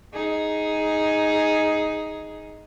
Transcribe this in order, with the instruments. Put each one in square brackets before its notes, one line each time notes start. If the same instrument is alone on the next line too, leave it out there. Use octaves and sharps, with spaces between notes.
[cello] D#4 G#4